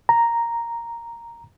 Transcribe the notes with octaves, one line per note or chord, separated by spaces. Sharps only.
A#5